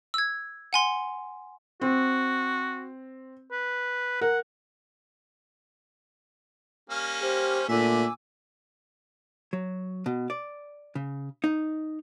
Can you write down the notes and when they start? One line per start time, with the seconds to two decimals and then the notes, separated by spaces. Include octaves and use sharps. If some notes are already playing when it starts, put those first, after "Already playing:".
0.14 E6 G#6
0.73 F#5 G#5 C6
1.81 C4 F#4
3.52 B4
4.21 A#4 F#5
6.90 G3 A#3 C#4
7.21 G4 C5
7.69 A#2 D3 A3 E5 G#5 D6 E6
9.53 F#3
10.06 B2
10.30 D5
10.95 C#3
11.44 D#4